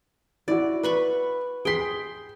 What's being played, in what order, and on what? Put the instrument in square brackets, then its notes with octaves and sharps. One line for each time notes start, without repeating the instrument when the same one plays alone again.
[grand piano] E4 F#4 [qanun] D5
[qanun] B4 B5 C#6
[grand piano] G#4 B6 [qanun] G5 C6